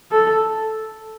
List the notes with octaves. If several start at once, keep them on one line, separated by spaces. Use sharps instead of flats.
A4